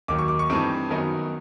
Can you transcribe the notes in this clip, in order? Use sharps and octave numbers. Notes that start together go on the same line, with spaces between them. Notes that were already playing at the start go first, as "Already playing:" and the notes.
D#2 D#3 F#3 D6
C#6
D6
C#6
G2 E3 A3 C4 D#4
F#2 D#3 F#3 B3 D#4